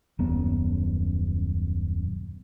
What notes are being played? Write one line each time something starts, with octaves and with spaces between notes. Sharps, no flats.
D#1 F#2 B3